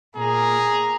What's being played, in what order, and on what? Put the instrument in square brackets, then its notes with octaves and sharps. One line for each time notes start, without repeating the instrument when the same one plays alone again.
[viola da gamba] A#2 A#3 [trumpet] G#4 [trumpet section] A#5